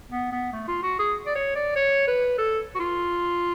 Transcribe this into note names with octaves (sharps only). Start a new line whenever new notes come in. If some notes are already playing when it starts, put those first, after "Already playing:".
B3
B3
A3
F4
F#4
G#4
D5
C#5
D5
C#5
B4
A4
F#4
F4